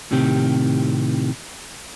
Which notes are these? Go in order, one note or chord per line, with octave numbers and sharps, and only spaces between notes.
A2 C3 D#3 C4 G4